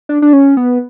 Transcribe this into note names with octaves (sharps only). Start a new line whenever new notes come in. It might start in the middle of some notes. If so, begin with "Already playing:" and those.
D4
D4
C#4
B3